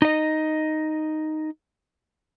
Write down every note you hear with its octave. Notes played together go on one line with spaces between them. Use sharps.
D#4 D#5